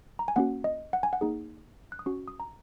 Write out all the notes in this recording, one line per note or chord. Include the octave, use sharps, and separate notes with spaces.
A#5
G#5
A#3 C#4 F#4 F#5
D#5
F#5
G#5
F#5
A#3 D#4 G#4
F#6
D#6
C#4 F#4 C#6
D#6
A#5